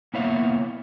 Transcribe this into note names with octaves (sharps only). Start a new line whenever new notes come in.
A#3 B3 E4 C#5 E5 F5